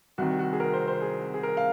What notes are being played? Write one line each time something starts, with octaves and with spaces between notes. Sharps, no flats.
C2 C3 D#3 F#4
F#4
G#4
A#4
C5
C5
G#4
G#4
A#4
F5